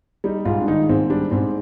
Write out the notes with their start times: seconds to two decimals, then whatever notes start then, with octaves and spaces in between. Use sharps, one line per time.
0.24 G3 D#4
0.45 G#2 F4
0.62 D4
0.68 D#3 D#4
0.89 G#2 C4
1.10 G3 D4
1.31 G#2 C4